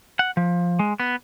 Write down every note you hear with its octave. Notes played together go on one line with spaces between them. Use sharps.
F#5
F3
G#3
B3